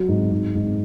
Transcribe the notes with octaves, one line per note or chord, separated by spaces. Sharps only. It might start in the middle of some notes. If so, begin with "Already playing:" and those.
Already playing: F#3
G#2
G#2
G#2